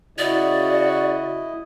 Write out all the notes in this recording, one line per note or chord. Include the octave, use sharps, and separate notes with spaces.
C#3 E4 F#4 D5 D#5